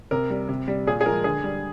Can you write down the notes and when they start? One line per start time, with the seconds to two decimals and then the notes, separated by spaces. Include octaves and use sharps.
0.11 C3 A#4
0.30 G3
0.49 C3
0.68 G3
0.87 A#2 G#4
1.01 G#4
1.06 F3 G#3 A#4
1.24 D3 G#4
1.44 G3